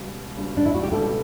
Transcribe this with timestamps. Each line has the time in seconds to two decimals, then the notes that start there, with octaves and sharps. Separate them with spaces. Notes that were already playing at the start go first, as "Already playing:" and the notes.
Already playing: C#2 B2 G3
0.37 C#2 B2 G3
0.57 D4
0.66 E4
0.74 F#4
0.83 G4
0.92 C#2 B2 G3 A4